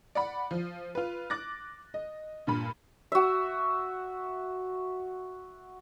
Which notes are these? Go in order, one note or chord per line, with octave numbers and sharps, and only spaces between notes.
D5 F#5 B5
F3
F4 B4
D6 F#6 A6 A#6
D#5
G2 A#2 B5
F#4 E5